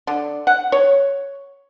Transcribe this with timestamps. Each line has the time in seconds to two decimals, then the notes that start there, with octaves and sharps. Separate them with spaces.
0.07 D3
0.47 F#5
0.72 C#5